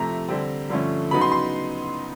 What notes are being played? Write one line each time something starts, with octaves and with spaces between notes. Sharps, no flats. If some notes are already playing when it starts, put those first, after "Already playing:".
Already playing: C3 F3 A3 A#5
D3 G3 C4
G2 D3 F3 A3 C#4
C#3 F#3 B3 D#4 B5
C6
C6